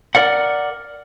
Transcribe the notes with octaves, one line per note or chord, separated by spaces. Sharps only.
A#4 D5 F#5